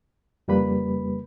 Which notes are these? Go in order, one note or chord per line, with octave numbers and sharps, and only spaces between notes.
F2 C#3 G3 A#3 B4 B5